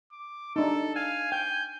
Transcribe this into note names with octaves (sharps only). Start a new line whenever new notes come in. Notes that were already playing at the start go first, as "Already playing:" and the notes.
D6
D4 D#4 A4
F5 G#5
G5 G6